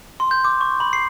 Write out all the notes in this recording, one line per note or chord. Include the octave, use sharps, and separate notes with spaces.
C6
G6
D6
C#6
B5
C7